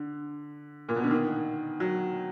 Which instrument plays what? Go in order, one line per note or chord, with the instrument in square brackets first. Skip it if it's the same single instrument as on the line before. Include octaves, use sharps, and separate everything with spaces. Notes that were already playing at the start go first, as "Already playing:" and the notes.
Already playing: [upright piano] D3
A#2
B2
D3
D#3
F#3